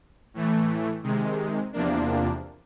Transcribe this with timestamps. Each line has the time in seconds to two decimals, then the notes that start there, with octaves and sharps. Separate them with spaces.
0.34 A2 E3 A3
1.03 C3 D#3 G#3
1.73 E2 C3 F3 A#3 D4